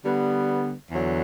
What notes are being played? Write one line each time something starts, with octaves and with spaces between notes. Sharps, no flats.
D3 G3 B3
E2 D3 F#3